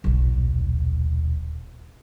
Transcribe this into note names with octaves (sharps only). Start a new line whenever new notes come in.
D#1 B1